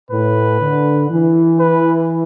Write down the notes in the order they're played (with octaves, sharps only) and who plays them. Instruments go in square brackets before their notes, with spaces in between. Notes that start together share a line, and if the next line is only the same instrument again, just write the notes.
[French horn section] A2 [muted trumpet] B4
[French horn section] D3
E3
[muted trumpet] B4